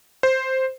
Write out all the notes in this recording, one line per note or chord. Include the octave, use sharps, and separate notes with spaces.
C5